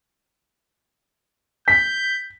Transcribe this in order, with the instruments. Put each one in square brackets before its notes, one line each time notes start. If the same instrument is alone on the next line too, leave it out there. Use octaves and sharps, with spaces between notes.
[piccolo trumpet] G6 [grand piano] B6